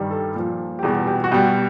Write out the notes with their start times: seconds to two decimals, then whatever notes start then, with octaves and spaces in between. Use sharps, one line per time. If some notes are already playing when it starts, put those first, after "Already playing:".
Already playing: G2 D#3 G3
0.11 A4
0.35 A#2 F3
0.79 G4
0.83 E2 B2 G3 G#4
1.07 G4
1.24 F#4
1.31 B2 G3 G4